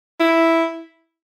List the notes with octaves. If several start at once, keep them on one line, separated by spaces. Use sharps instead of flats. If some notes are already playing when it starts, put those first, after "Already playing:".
E4